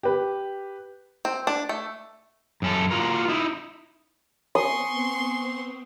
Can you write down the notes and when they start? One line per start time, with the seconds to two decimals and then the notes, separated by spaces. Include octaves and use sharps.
0.03 G4 B4
1.25 C4
1.47 D4
1.69 A3
2.62 F#2 C#4 A4
2.91 F4 F#4 A#4
3.28 D#4 E4
4.55 B3 C4 G#5 C6 C#6 D#6